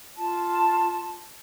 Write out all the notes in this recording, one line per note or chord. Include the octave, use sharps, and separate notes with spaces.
F4 A5